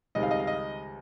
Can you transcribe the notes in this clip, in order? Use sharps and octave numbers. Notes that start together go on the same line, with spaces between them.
C#2 C3 D#3 G3 D#5
F5
D#5
F5
D#5